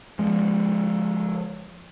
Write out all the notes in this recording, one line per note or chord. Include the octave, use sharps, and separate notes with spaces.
F3 G#3